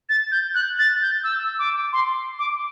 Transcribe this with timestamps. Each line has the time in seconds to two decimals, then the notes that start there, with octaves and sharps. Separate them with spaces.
0.09 A6
0.32 G6
0.55 F#6
0.79 A6
1.02 G6
1.24 E6
1.59 D6
1.93 C6
2.39 D6